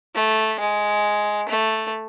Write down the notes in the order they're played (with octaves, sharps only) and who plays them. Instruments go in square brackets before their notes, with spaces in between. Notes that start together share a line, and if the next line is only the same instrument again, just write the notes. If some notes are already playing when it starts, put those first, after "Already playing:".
[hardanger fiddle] A3
G#3
A3